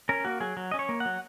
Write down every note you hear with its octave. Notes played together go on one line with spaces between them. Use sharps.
C#4 A#4
A#3 F#4
F#3 G#4
F#3
C#4 D#5
C#5
A#3
F#5
F#3